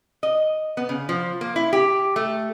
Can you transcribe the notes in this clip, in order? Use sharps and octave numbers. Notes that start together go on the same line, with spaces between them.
D#5
B3
C#3
F3
A#3
E4
G4
A3